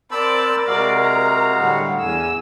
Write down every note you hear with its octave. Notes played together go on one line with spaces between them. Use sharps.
C4 A#4 C5 D5 A5 B5 E6
C3 G#3 F#4 D5 F5
A#5
A2 D3 G3 F#5
E2 G#5 E6